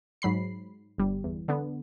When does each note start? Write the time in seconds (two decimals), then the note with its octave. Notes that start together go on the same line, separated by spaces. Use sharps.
0.22 G#2 F#3 B5 C7
0.98 G1 G3
1.24 E2
1.48 D3 B3